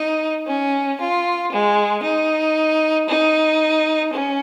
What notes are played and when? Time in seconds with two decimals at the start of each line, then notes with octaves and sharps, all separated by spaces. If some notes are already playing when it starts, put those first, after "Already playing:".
Already playing: D#4
0.47 C#4
0.99 F4
1.51 G#3
2.03 D#4
3.08 D#4
4.12 C#4